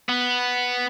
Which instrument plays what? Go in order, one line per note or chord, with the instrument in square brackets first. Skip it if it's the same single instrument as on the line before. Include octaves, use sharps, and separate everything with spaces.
[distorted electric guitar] B3